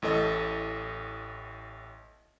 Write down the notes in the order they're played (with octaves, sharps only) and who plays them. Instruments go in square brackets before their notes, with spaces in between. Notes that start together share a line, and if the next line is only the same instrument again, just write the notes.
[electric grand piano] A1 A2 A4 D#5